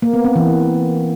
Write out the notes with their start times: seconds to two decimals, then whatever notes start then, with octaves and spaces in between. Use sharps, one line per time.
0.02 A#3
0.13 B3
0.25 C4
0.36 E3